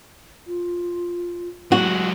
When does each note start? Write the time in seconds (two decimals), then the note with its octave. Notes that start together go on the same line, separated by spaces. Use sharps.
0.47 F4
1.72 F#3 G#3 F#4